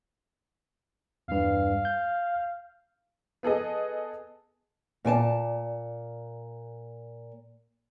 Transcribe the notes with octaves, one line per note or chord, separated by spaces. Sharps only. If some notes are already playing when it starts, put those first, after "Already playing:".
E2 G2 F5
G6
B3 G#4 A4 D#5
A#2 D5 G#5 A5